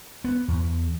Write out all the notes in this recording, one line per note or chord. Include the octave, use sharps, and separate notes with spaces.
B3
E2